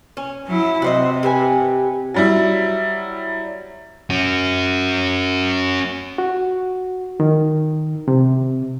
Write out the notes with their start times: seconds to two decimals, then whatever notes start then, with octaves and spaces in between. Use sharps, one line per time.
0.17 C#4
0.47 F#3 E4
0.82 C3 F#4 C5 D#5
1.23 G4 B4 G#5
2.14 F#3 G3 E4
4.10 C#4 F#4
6.18 F#4
7.20 D#3
8.08 C3